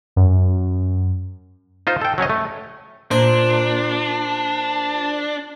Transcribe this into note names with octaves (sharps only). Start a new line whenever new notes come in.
F#2
D#4 F4 C5
A4 G5
F#3 C#4 C#5 D#5
A3
A#2 D4 C5